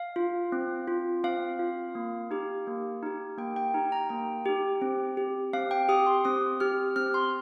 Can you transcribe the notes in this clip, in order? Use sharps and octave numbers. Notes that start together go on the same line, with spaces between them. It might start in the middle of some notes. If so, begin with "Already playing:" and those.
Already playing: F5
F4
C4
F4
C4 F5
F4
A#3
D#4 G4
A#3
D#4 G4
A#3 G5
G5
D#4 G4 A#5
A#5
A#3 G5
D#4 G4
C4
G4
C4 F5
G5
G4 D#6
C6
C4 D#6
G4 F6
C4 F6
C6